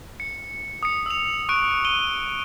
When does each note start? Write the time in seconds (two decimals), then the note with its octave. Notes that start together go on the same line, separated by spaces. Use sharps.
0.20 C#7
0.83 D#6 C#7
1.06 E6 F7
1.49 C#6 F#6 D7
1.85 D#7 G7